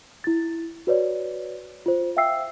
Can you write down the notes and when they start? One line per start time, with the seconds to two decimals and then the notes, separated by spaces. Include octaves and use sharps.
0.24 E4 A6
0.87 F#4 B4 C#5 D5
1.86 F4 C5
2.17 E5 F5 G5 E6 C7